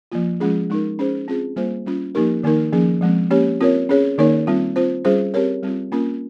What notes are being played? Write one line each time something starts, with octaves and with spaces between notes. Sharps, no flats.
F3 A#3 F4
F3 G#3 C#4 F4 G#4
G#3 D#4 A#4
C#4 G#4 C5
C4 F4 G#4
G3 A#3 F4 C5
G3 C#4 F4
F3 A#3 D#4 G4 A#4
D#3 A#3 D#4 A#4
F3 A#3 C#4 G#4
F3 G#3 C4
A#3 C#4 G4 C#5
C4 F4 A#4 C#5
C#4 G#4 C#5
D#3 A#3 D#4 A#4 C#5
G3 C4 F4
C4 F4 C5
G3 C#4 F4 G#4 C5
C4 G4 A#4 C#5
G3 C4 F4
A#3 C#4 F4 A#4